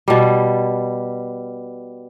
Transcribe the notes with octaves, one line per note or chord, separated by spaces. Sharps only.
B2 G3